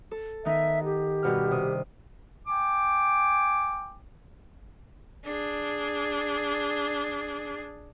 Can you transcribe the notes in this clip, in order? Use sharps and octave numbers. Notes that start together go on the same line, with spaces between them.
A4
D#3 B3 D#4 E5
G4
G2 B2 F6
C3 D#6
G5 G#5 D6
D4 G#4